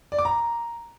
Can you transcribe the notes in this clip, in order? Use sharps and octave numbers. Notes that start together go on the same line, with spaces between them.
D5
D6
A#5